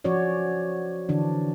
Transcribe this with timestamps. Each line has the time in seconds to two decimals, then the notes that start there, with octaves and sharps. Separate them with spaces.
0.04 F3 C#4 F#4 C#5 D5
1.09 D3 E3 D4